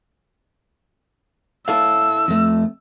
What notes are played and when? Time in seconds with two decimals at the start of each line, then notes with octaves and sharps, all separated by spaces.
1.68 E4 A4 F5 E6
2.28 F2 A3